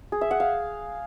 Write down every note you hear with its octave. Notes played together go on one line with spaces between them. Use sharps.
G#4
E5
F#5
F5